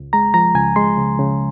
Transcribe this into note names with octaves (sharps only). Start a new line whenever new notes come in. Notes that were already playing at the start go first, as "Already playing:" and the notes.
Already playing: C#2
G#3 A#5
F3 A#5
C#2 G#5
G#3 C6
C#3
C#3